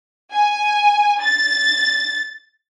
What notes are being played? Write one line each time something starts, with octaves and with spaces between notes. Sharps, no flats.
G#5
A6